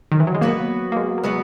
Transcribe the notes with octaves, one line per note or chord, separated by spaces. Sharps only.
D#3
E3
F#3
G#3
F#3 A#3 B3 F#4 B4
A#3
G#3
A#3
F#3 G#3 B3 F#4 B4